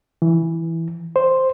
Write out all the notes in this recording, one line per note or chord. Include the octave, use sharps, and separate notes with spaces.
E3
C5